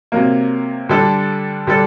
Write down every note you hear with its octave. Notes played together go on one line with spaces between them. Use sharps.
C3 F#3 A#3
D3 G3 D4 A4
D3 G3 D4 A4